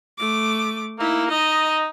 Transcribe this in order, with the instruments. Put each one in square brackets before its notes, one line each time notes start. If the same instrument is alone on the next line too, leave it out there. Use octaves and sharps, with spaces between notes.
[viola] A3 D6
[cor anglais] A#3 [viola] D#4 E4
[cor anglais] D#4 [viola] D#5